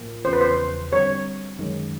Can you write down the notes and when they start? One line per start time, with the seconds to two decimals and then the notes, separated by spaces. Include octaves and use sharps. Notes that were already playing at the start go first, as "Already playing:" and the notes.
Already playing: A2 F3 A#3
0.25 E2 C#3 F3 C5
0.33 B4
0.41 C5
0.91 D3 G3 C4 C#5
1.59 F#2 D#3 G#3 C#4